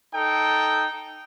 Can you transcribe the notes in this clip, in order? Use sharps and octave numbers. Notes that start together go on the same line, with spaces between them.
D#4 A4 G5